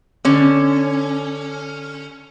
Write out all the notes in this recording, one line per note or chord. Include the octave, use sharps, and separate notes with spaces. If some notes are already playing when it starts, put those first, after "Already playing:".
D3 C#4